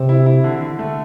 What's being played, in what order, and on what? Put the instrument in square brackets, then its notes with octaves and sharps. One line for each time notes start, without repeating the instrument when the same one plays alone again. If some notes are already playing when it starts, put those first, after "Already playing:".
Already playing: [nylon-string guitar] C3
[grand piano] E4
E4
D3
D3
A3